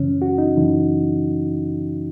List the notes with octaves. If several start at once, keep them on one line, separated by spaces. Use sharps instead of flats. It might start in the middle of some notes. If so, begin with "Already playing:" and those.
Already playing: F#2 C#3 E3 C#4
F#4
D#4
F#2 C#3 E3